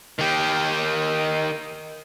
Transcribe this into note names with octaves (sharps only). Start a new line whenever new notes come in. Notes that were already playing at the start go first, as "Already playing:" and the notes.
D#3 G4